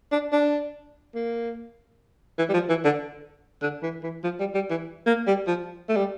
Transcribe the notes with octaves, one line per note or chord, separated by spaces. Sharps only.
D4
D4
A#3
E3
G3
F3
E3
D3
D3
E3
E3
F3
G3
G3
E3
A#3
G3
F3
A3
G3